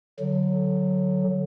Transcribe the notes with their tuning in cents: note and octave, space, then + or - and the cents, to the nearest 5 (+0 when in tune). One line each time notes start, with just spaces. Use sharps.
D3 +0 F#3 +0